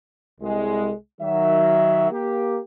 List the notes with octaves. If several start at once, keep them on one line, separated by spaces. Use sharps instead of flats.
C2 G#3
D#3 F#3 E5
A#3 G4